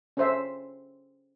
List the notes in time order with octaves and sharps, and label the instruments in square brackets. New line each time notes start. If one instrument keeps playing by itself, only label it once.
[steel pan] C#4 A4 C5 E5